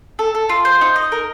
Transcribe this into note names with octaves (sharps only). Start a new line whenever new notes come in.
A4
A4
F4
C5
D#4
D#5
A#4